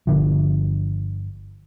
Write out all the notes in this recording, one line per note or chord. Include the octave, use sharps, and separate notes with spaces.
G1 D3 F3